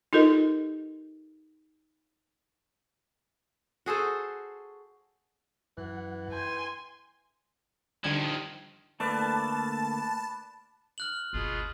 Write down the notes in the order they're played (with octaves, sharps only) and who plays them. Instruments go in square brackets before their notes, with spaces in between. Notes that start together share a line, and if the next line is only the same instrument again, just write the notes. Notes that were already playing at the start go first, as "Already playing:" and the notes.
[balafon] D#4 F4 G4 A4 A#4 D#5
[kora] F#4 G#4 A4 C5
[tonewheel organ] F#2 F#5 [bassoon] E3
[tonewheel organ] G5 [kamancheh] G#5 C6
[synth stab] D3 G3 G#6 [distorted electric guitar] D#3 F3
[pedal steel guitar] D3 A3 A#3 [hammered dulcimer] B4 D5 F5 [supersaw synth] A5
[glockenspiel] F6 F#6 F#7
[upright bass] G1 D2 [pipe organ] B2 F4 G#4